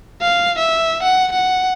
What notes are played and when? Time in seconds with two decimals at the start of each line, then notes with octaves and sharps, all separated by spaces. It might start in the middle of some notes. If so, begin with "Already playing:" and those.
0.21 F5
0.58 E5
1.03 F#5
1.32 F#5